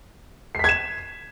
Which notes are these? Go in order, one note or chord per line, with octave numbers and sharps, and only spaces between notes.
G#6 B6 C7 E7